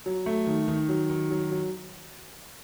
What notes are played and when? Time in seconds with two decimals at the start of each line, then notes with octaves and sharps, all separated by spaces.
0.06 F#3
0.26 A3
0.47 D#3
0.68 D#3
0.89 F#3
1.10 D#3
1.31 F#3
1.51 F#3